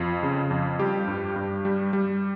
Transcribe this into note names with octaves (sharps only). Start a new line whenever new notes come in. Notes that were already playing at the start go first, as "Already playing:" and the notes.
Already playing: F2 F4
C#3
F2
G3 G4
G2
G2
G3
G3